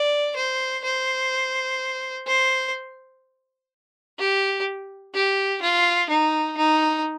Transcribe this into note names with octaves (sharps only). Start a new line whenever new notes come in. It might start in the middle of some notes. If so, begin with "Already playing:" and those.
Already playing: D5
C5
C5
C5
G4
G4
F4
D#4
D#4